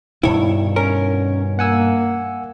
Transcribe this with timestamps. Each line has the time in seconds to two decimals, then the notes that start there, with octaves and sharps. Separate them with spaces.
0.23 G2 B2 D#3 E4 C#5
0.76 C#4 A#4
1.59 A#3 F#5 G#5 E6